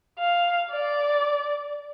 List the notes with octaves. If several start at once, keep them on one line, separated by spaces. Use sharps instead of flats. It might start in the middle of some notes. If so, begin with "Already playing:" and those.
F5
D5